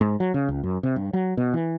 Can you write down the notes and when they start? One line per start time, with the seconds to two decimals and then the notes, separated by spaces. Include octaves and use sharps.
0.01 G#2
0.20 F#3
0.34 C#3
0.49 C#2
0.63 F#2
0.83 C3
0.96 G2
1.13 F#3
1.37 B2
1.54 E3